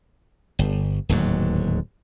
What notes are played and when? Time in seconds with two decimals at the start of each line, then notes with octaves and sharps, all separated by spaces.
0.59 G1
1.09 D1 D#2 G#2 F#3